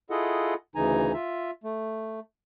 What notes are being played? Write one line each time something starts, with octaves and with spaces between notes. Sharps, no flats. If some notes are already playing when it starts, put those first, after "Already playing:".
E4 F4 G#4 A4 D#5 F#5
D2 C#3 E3 D#4 G#5 A#5
F4 E5
A3